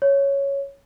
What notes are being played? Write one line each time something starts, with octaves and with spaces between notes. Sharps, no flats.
C#5